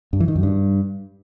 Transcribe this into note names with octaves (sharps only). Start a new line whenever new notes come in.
G2
E3
D#3
F#2
G2